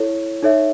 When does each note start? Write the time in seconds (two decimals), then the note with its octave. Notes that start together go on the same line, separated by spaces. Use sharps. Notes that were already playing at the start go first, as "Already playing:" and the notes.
Already playing: E4 A4 C#5
0.43 D#4 A4 C#5 E5